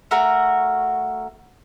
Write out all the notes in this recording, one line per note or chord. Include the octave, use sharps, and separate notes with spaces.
A3 F#4 A#4